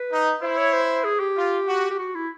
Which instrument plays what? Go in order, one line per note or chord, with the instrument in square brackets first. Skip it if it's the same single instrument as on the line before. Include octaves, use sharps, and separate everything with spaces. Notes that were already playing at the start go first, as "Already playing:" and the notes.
Already playing: [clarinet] B4
[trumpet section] D#4
[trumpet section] E4 [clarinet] C5
[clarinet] C#5
C5
G#4
G4
[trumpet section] F4
F#4
[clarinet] G4
F#4
E4